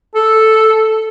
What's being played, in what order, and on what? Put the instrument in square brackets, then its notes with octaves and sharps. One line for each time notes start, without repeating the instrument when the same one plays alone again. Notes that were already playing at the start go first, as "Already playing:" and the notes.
[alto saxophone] A4